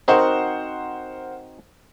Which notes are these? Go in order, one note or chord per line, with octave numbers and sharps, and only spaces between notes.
C4 D#4 F#4 A#4 C5 F#5